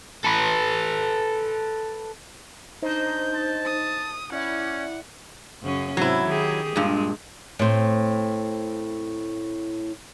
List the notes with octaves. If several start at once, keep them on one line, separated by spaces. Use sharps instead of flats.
A4 B4
D4 D#4 C5 D#5 G6
A5
D#6
C#4 E4 D5 E5 F#5
F#2 C#3 C#4
G#2 C3 F#3 E4
D#3 G4 G#4
G2 A#2 G#3
A2 C4